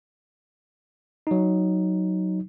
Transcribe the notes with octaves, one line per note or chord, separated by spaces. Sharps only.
F#3 D#4